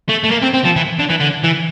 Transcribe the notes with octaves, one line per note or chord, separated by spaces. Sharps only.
A3
A3
A#3
C4
C4
F3
E3
D3
E3
D3
E3